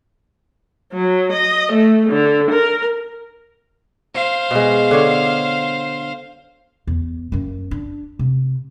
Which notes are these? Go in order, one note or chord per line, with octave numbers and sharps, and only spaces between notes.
F#3
D#5
A3
D3
A#4
C5 F5
B2 G#3
D3 C#5
E2
F#2 A#3
D4
C3